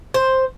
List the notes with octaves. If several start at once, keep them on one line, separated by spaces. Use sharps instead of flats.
C5